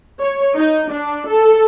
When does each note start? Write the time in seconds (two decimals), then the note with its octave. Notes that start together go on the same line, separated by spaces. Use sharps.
0.21 C#5
0.59 D#4
0.93 D4
1.30 A4